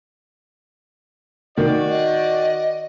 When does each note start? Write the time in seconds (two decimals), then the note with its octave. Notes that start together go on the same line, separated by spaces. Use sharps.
1.58 D#3 F#4 D5
1.90 D#5